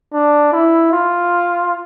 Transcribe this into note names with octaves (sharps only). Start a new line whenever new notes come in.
D4
E4
F4